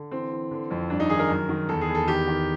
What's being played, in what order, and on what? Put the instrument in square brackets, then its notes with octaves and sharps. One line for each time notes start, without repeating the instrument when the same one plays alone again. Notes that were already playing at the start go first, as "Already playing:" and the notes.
Already playing: [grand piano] D3
E3 C4
E3
D3
F2
G2 D4
D#4
D#3 G#4
A#4
F#2
D#3
E2 A4
G#4
E2
A4
D#3 G4
D#3